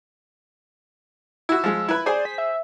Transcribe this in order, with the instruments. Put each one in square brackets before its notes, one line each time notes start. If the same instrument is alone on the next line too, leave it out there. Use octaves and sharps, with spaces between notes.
[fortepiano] E4 F#4 [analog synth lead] E6
[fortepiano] F3 G#3
[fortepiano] E4 B4 B5 [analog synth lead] G#6
[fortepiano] G#4 C5 G#5 [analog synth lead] D5
[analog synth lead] B6
E5